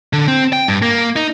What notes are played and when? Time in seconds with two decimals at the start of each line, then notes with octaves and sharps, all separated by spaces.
0.13 D3
0.28 C4
0.53 G5
0.68 G2
0.82 A#3
1.16 D#4